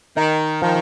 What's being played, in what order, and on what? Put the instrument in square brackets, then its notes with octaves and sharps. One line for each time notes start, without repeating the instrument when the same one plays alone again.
[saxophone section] D#3 [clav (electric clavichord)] D#4
[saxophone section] D#3 [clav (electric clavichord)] F3